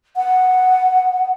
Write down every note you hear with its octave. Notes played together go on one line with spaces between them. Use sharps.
F#5